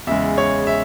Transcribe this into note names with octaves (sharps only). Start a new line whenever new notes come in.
E2 C#3 G#3 E5
C#5
E5